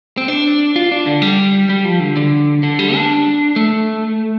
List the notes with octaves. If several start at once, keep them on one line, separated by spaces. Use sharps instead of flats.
C4
D4
F4
D4
D3
G3
G3
F3
D3
D3
D3
G3
D4
A3